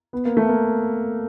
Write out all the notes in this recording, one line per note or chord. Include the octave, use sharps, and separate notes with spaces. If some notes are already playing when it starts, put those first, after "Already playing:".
B3
A#3
A3
A#3